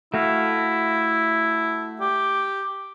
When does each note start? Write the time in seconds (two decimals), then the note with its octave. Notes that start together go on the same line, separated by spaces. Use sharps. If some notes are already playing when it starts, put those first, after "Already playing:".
0.14 A3 E4 F#4 F5
2.00 G4